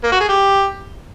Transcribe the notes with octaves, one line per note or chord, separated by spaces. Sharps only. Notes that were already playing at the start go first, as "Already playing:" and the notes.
A#3
F#4
G#4
G4